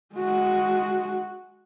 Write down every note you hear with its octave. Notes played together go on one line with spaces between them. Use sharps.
G#3 F#4